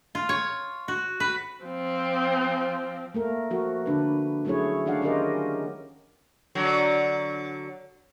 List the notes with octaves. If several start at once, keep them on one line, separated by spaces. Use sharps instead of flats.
F4
C#5
F#4
B4
F3 C4
A3 A#3 A#4
F3 F#4 A#4
D3 D4 B4
F#3 A3 C#4 E4 G#4 C#5
D#3 C#4 D4 D5 F5 F#5
C#4 F4 G4 G#4 A#4 D#5
D3 F#3